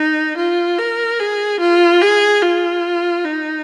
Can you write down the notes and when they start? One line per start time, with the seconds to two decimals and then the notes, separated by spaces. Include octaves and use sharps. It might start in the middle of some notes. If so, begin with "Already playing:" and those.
Already playing: D#4
0.37 F4
0.78 A#4
1.19 G#4
1.60 F4
2.02 G#4
2.42 F4
3.25 D#4